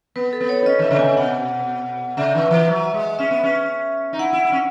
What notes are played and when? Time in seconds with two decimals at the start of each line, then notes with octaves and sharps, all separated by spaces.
0.16 B3 B4
0.33 A4
0.41 B3
0.49 C#5
0.62 D#4
0.66 C#4 D#5
0.79 D#3 E5
0.91 C#3
0.99 B2 G#5
1.04 C#3
1.17 B2 F#5
2.17 C#3 E5
2.35 D#3
2.51 E3
2.68 F#3
2.94 G#3
3.19 C#4 E5
3.31 B3
3.44 C#4
4.13 D#4
4.19 E4 F#5
4.33 E4
4.45 E4
4.52 C#4